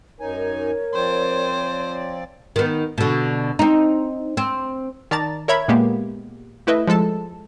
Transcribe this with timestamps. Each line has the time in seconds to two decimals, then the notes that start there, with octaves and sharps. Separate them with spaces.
0.21 F#2 D#4 A#4 C#5 G#5
0.94 F3 C4 C5 D5
2.56 D#3 B3
2.98 B2 D3
3.59 C4 D#4
4.37 C4
5.11 D#3 D5 A5 A#5 A6
5.48 A#4 C#5 E5 B5 G#6
5.68 A#2 G#3 A#3 B3 G4
6.67 A3 E4 B4 D#5 E5
6.87 F3 G#3 A4 A5